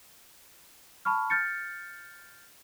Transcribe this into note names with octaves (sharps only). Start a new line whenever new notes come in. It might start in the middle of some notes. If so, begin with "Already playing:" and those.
A5 B5 C#6 F6
F6 G6 A6 C#7